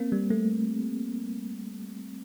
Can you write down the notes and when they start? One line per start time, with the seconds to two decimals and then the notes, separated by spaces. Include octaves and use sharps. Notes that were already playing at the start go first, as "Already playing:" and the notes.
Already playing: A#3 C4
0.12 G3
0.30 A3